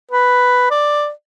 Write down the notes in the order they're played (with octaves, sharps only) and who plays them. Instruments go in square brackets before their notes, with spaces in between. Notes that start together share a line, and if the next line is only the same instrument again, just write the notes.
[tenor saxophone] B4
D5